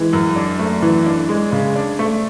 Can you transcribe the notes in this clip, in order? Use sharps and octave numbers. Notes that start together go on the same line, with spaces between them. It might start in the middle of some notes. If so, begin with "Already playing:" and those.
Already playing: E3 G#3
F#2
D4
A3
E3
D4
G#3
C#3
D4
A3